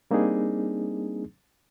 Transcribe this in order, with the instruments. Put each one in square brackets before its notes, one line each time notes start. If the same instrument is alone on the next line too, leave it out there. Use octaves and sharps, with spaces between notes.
[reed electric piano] G3 A#3 C4 D4 D#4 G#4